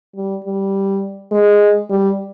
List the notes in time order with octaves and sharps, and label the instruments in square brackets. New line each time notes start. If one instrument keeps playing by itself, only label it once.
[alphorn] G3
G3
G#3
G3